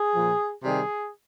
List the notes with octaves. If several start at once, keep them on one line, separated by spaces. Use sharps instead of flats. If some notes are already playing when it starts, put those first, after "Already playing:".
Already playing: G#4
A#2 F3
C3 D#3 G3 G#4